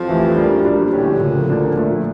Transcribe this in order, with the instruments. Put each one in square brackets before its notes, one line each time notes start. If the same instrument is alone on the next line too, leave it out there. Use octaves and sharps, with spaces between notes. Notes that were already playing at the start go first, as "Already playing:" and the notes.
Already playing: [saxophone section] F2 F3
[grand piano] E3 A3 E4 G4
G3 D4 G4 A#4
A#2 G3 D4
[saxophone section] D2 D3 [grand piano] A2 F3 C#4 G4
[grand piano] C#3 F3 A#3
A#2 F3 A#3 D4
A#2 F3 A3